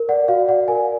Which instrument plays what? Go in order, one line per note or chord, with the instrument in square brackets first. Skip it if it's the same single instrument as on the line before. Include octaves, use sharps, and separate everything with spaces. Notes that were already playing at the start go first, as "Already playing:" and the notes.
Already playing: [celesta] A#4
D5 F#5
F#4 F5
D5 F#5
A#4 G#5